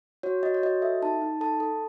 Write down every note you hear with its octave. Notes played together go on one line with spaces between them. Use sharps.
F#4 C#5
F#4 D#5
C#5
F#4 D#5
A4 E5
D#4 A5
D#4
A4 A5
A4